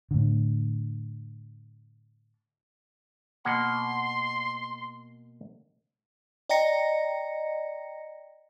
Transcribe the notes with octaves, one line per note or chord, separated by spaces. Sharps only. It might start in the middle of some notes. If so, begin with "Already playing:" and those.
A2 D3
B2 A#3 F#5 C6
D5 D#5 G5 A#5 A#6 C#7